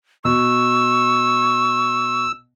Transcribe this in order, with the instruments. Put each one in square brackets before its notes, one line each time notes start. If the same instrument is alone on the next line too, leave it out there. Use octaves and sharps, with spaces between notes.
[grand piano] B2 [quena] C#6 [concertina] E6